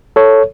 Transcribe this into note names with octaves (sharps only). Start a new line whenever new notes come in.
A4 C#5